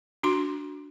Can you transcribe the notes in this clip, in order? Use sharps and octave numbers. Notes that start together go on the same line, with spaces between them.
D4 F#4 C6